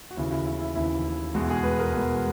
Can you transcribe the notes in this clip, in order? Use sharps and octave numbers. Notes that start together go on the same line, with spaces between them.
F#4
D#2 C#3 E3 E4
E4
E4
E4
D#2 C#3 E3 E4
E2 B2 G#3 F#4
G#4
B4
A#4
E2 B2 G#3